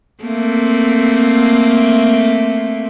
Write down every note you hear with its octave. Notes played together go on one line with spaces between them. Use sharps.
A3 A#3 C4